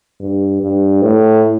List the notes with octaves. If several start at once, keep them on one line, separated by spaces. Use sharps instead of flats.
G2
G2
A2